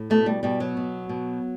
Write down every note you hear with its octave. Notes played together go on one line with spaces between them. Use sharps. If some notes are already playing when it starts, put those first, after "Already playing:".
Already playing: A2
B2 A3
G3
B2 G3
F#3
B2
B2